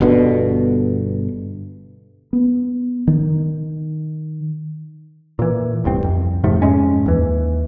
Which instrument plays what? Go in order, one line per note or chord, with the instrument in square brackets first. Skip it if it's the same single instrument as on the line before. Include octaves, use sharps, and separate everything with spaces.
[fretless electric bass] G1 G2 B2 D3
[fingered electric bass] B3
D#3
[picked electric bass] A#2 E3
D1 C2 G2 C4
F2
G#2 C3 F3 A3
F2 G#2 G#3 C#4
D#2 E3